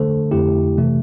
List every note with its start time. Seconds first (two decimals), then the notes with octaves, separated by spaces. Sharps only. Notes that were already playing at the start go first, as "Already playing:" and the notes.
Already playing: D3 A3 D4 A4 C5
0.31 F2 D3 A3 E4 G4
0.78 C3 E3 A3